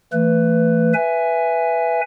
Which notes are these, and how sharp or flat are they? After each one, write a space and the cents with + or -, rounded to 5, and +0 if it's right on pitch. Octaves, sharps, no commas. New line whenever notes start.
E3 +20 A3 +30 B4 +10
B4 +0 E5 +10 G#5 +0